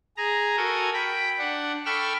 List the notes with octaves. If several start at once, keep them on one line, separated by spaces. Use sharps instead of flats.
G#4 A#5
F#4 A4 A#4 G#5
G5 B5
D4 F#5
A4 G5 B5 C#6 E6 F6